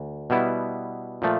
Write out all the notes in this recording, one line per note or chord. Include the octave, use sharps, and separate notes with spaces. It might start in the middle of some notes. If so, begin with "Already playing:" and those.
Already playing: D2
B2 G3 B3 E4
A#2 F3 A3